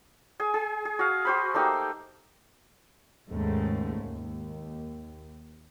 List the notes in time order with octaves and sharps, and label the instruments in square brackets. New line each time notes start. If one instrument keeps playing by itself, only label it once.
[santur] G#4 G#5
G#4
G#4
F#4 F5
F#4 C5 B5
A3 A#3 D#4 G4
[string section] D#2 G#2 C#3 A3
D#2